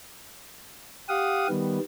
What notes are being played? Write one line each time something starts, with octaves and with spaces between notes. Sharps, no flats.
G4 F5 F#5 D#6
D#3 G3 B3